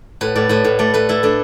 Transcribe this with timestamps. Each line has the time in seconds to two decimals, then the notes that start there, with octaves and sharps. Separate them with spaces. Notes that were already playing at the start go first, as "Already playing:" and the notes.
0.21 A2 B4
0.36 A2 D5
0.49 A2 B4
0.64 A2
0.79 A3 D5
0.94 A3 B4
1.09 A3 E4
1.23 A3 D4